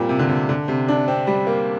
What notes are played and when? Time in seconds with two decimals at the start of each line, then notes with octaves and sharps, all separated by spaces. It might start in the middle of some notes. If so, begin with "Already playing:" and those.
Already playing: A#2 G3 A#3 C4
0.09 C3
0.19 D3
0.29 C3
0.49 D3
0.68 C3
0.88 D4
1.08 C4
1.27 G3
1.47 A#3